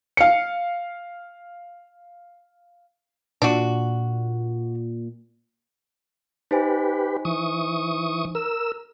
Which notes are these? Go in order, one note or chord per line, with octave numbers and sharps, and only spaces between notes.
F5 C#7
A#2 D4 F#4
D#4 G4 B4 C5 G#5
E3 C#6 D#6
A#4 E6